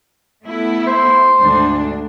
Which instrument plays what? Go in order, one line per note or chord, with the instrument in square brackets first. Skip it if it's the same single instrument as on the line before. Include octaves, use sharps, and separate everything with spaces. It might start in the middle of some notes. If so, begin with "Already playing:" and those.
[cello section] A3 B3 E4
[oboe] C5
[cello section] D2 G#2 D4